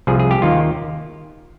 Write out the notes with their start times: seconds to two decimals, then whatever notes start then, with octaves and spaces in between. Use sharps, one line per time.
0.07 C2 C3 F3 G#4
0.19 G#4
0.31 G4
0.42 D#2 D#3 A#3 F4